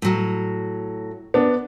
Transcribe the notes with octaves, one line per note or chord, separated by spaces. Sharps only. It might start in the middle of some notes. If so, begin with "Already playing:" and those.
A2 F#3
B3 D4